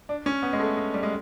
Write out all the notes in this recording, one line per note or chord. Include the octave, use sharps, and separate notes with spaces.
D4
C#4
B3
G#3
A3
G#3
G3
G#3